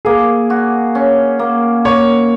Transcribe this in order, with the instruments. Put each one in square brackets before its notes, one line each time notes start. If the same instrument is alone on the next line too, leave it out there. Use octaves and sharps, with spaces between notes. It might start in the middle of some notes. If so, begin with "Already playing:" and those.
[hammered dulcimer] A#3 [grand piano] G#4
[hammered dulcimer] F#4
C#4
A#3
[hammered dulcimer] A#3 [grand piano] C#5